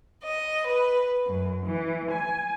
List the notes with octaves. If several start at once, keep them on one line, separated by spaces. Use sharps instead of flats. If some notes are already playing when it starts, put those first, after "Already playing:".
D#5
B4
F#2
E3
G#5